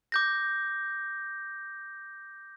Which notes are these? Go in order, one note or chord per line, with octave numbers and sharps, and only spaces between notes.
D6 G6 A#6